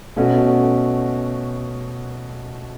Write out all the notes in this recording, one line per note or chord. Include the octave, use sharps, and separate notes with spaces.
B2 A3 C#4 F#4